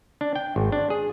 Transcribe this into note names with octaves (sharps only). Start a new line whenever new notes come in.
D4
G5
G#1
D4
G#4